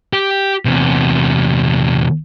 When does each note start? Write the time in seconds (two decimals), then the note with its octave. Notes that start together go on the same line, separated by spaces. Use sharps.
0.13 G4
0.65 E2 C3